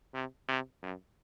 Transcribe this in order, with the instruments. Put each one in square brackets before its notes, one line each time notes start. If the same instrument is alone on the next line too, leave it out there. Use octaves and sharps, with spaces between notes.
[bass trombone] C3
C3
F#2